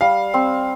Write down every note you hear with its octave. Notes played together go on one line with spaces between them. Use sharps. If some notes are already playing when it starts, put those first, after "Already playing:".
G3 F5
C4